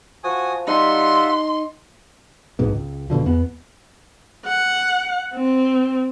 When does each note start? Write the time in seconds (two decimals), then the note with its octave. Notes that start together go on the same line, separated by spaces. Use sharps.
0.24 F3 F#4 G#5 D#6
0.68 G3 D#4 F4 E5 F#5 C6
2.59 A#1 G#2 B2
2.74 C#2
3.10 D#1 B2 D3 F3
3.26 E2 B3
4.46 F#5
5.35 C4